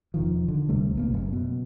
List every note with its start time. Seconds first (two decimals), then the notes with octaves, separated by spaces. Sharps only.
0.14 E1 D#3 F3
0.48 D3
0.69 D2 C3 G3 A3
0.95 B1 B2 A#3
1.13 F#1 F#2
1.33 B2